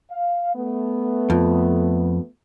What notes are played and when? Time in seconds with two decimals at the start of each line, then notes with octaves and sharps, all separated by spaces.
0.11 F5
0.55 A3 B3
1.30 F2